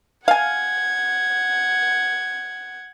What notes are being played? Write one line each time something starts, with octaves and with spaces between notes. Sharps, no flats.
F5 F#5 G#5 G#6